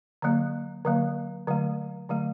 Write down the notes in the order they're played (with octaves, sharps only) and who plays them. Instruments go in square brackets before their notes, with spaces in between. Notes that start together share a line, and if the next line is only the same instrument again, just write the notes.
[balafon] D3 F#3 A#3
D3 F#3 A#3
D3 F#3 A3
D3 F#3 A3